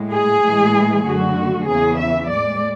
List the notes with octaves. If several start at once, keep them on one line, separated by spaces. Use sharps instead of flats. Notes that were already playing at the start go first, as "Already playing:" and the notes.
Already playing: A2 G#3
G#4
A2 E3 G#3
F#2 D3 A3 F#4
E2 C#3 E3 G#4
E5
A2 G#3 D5